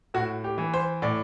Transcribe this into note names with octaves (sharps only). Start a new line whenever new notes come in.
A2 F#4
G4
E3
C5
A2 D5